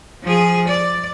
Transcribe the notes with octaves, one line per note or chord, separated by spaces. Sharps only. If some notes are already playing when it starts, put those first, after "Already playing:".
F3 G#4
D5